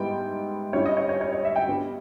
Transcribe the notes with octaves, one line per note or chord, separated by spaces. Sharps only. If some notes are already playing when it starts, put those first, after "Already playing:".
Already playing: G#2 G3 B3 E4 G5
G2 G3 C#4 E4 C#5
D#5
C#5
C#5
C#5
C#5
E5
G5
G2 G3 B3